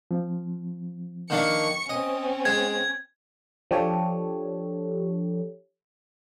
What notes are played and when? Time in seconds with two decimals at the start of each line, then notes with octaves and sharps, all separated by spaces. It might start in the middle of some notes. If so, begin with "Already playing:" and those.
0.11 F3 C4
1.30 D#3 A#3 D4 C#6 C#7
1.89 C4 C#4 D#5
2.45 G#3 G#6
3.71 F3 D4 G4 A4 C#5